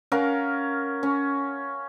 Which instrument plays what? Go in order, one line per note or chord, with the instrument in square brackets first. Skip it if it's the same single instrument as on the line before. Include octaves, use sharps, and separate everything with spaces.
[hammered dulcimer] C#4 A#4 F5 F#5
C#4